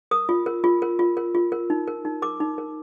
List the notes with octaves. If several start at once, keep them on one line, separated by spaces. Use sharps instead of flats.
A#4 D#6
F4
A#4
F4
A#4
F4
A#4
F4
A#4
D#4
A#4
D#4
A#4 D6
D#4
A#4